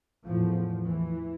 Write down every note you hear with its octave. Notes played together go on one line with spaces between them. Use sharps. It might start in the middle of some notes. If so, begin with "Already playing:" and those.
E2 A2 F3
E3